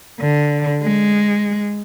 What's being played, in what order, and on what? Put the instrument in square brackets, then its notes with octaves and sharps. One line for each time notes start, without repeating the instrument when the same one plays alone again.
[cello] D3
G#3